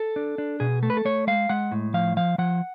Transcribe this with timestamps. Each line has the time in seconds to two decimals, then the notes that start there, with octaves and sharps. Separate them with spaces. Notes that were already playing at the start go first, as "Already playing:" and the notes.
Already playing: A4
0.16 D4
0.38 D4
0.60 B2 G#4
0.83 A3 A4
0.90 B4
0.97 A4
1.05 A3 C#5
1.27 G#3 F5
1.49 G#3 F#5
1.72 A2
1.94 F3 F5
2.17 F3 F5
2.38 F3 F#5